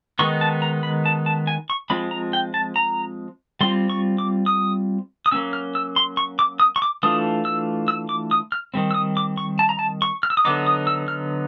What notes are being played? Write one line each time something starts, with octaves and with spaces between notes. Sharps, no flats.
D#3 G#3 B3 D#4 C#6
A5
A#5
B5
A5
A5
G#5
C#6
F3 G#3 C4 F4 B5
A#5
G5
A5
A#5
G3 C4 F4 C6
C#6
D6
D#6
D#6
F#3 A#3 C#4 E6
F6
E6
C6
C#6
D6
D#6
C#6
D6
E3 A3 D4 F4 D#6
E6
E6
D6
D#6
F6
D#3 G3 C4
E6
D#6
D6
C#6
A5
A#5
A5
C#6
F6
E6
D#6
D3 F#3 B3 D#4 D6
D#6
E6
F6